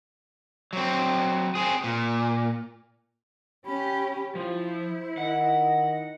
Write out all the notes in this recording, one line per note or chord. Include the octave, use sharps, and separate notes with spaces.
F#3 C4
C4 G#4
A#2
C#4 G4 B5
F3 E4 C5
D#3 D#5 F#5